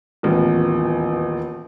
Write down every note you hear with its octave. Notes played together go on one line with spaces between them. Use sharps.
D#1 A1 E2